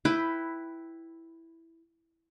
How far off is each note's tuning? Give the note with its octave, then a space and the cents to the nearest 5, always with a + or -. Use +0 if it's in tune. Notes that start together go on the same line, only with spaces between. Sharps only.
E4 +0 B4 +10 G5 +0